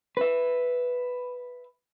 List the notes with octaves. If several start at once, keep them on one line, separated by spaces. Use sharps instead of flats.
B4 E5